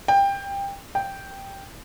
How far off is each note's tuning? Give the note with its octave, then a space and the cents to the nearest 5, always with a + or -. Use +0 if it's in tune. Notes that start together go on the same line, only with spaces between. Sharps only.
G5 +20
G5 +0